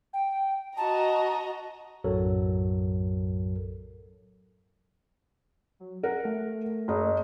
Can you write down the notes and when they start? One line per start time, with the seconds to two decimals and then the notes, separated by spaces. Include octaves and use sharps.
0.13 G5
0.77 F#4 D#5 A5 A#5
2.04 B1 F#2 A2 F#3 A4 A#4
5.80 F#3
6.03 A#4 F#5
6.25 A3
6.88 F#1 D#5